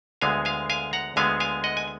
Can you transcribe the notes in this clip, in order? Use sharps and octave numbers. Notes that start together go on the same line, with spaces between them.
D2 D3 G#3 B3 F5 G#5
F5 G#5
F5 G#5
F#5 A#5
D2 D3 G#3 B3 F5 G#5
F5 G#5
D#5 F#5
G#5